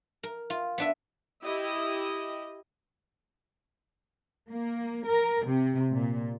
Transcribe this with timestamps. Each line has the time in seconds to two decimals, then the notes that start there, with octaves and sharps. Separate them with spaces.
0.23 A#4
0.50 F4
0.78 B3 D4 E5
1.43 E4 G4 D#5
4.50 A#3
5.07 A#4
5.47 C3
5.93 A#2